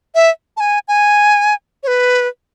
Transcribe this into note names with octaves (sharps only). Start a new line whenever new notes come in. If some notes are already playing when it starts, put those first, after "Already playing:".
E5
A5
G#5
G#5
C#5
B4